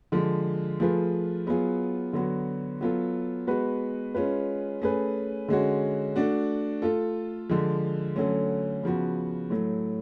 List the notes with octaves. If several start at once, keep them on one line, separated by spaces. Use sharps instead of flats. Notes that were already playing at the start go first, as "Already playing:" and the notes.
D3 F3 G#3
F3 A3 F4 G#4 B4
F#3 B3 F4 G#4
D3 F#3 B3 F#4
F#3 B3 F4 A4
G#3 B3 F#4 B4
G#3 C#4 F4 B4
A3 C#4 G#4 B4
D3 G#3 C#4 F#4
A3 D4 F#4
A3 F4 A4
D3 F3 G#3
D3 F#3 A3 C#4
C#3 F3 B3 F#4
A2 F#3 A3